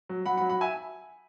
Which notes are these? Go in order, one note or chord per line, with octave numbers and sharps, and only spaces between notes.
F#3
F#3 F#5 B5
F#5 B5
F#3
F#5 B5
E5 G#5